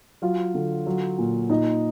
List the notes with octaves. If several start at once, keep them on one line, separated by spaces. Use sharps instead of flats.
F#3 F4 F5
D3
F#3
A#2
A#2 D#4 D#5